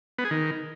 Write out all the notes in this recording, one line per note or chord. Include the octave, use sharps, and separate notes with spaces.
B3
G#4
D#3